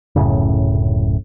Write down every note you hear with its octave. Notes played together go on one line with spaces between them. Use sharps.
D1 F#2 A2 C#3